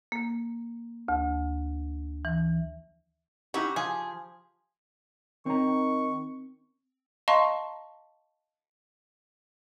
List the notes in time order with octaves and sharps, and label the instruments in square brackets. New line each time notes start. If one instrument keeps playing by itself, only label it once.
[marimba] A#3
D2
E3
[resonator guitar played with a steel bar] D#4 E4 G4 [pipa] F#4
[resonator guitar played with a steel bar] F3 [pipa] G#4
[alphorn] D#3 [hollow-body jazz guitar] C4 C#5 A#5 [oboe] C#6
[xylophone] D#5 F5 A5 A#5 C6 C#6